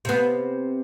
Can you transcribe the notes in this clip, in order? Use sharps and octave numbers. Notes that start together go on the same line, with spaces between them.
C3 B3